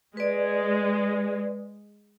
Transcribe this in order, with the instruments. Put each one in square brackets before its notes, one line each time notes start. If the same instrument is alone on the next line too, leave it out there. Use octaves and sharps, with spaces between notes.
[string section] G#3 [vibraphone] B4 D5